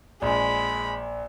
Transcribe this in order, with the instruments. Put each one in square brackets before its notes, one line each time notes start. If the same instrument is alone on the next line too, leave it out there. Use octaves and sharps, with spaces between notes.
[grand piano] A#1 [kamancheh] G#3 B5